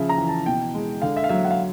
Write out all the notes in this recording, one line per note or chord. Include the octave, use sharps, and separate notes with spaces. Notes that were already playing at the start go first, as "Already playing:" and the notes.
Already playing: C#3 F3 E5
A#5
E3
A5
B2 G5
G#3
D3 F5
E5
F5
F#3 E5
F#5
F5